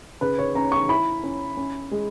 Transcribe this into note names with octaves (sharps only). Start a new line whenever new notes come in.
C#3 B4
C#5
C#4 A#5
C#6
E4 B5
C#4
C#4
G#3